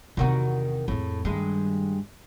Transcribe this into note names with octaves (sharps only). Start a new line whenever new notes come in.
E2 C3 D#3 C4 F#4
F2 A2 G#3
G2 D#3 G#3 A3